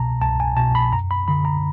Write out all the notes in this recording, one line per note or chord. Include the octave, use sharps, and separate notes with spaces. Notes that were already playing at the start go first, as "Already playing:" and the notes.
Already playing: C2 B2 A5 A#5
C2 A5
G#5
B2 A5
B5
F#2 A#5
B5
D3 B5
A#5